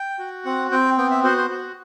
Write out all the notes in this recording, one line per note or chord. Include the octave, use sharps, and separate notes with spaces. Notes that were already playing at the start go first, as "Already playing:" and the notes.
Already playing: G5
F#4
C4 F#5
C4 G5
B3 G5
E5
F#4 C5
C5
F#4